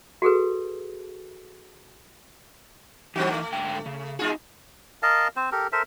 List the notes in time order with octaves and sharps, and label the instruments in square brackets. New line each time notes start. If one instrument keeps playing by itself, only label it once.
[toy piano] F#4 G#4 A4 B4
[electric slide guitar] E3 D#4 [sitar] F#3 C4 F#4
[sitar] A3
[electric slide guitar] G#2 D3 G5
C#3
[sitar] G#3 F4 G#4 [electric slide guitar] D#4 F#4
[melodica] A#4 D#5 F5 A5
C4 C5
G4 A4 A#4
A4 A#4 C5 E5